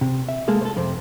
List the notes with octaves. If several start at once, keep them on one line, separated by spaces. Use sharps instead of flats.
C3
E5
G#3 A#3 G#4 A4
A4 C5
F2 C3 C4